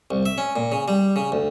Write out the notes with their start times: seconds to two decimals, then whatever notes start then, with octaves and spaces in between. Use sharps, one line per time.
0.11 C2
0.26 E5
0.38 C#4
0.56 A#2
0.72 C#3
0.88 G3
1.16 C#3
1.32 D2